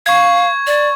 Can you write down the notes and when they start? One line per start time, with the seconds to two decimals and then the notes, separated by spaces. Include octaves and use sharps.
0.06 F5 C#6 G#6
0.67 D5